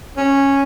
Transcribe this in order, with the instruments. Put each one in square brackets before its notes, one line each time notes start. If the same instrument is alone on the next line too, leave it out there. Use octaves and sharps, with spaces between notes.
[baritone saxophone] C#4